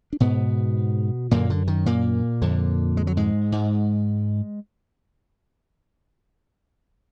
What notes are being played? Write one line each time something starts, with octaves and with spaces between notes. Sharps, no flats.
D4
G#2 B2 B3
F#2 A#2 D3 A#3
D3
D#3
A#2 A#3
F2 D3
G#3
F#3
G#2 G#3
G#2